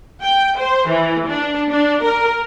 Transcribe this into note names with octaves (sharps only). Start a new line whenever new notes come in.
G5
C5
E3
D4
D4
A#4